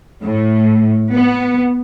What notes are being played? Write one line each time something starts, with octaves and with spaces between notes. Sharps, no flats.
A2
B3